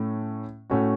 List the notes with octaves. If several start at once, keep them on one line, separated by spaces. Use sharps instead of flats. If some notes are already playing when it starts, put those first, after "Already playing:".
Already playing: A2 A3 C#4
A2 A3 C#4 F#4